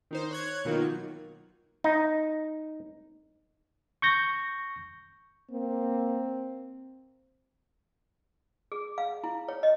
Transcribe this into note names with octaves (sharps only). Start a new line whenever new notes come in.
D#3 D#4 C5
C#5 F#6 G#6
B2 D#3 F#3 A#3 D#4 F4
D#4
C#6 G6 A#6
A#3 C4
G#4
F5
E4
C#5
D#5